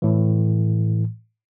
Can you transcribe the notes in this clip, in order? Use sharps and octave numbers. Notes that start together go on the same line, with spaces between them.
A2 E3